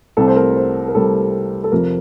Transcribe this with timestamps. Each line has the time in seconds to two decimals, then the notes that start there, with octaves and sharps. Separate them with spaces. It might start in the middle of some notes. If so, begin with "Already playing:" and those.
0.17 C2 C3 G3 C4 A4
0.28 C5
0.36 A#4
0.57 C5
0.88 A#4
0.95 C2 C3 G3 C4 A4
1.64 A4
1.72 F2 C3 F3 A#4